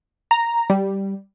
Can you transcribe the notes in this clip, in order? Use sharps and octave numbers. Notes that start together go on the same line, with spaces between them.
A#5
G3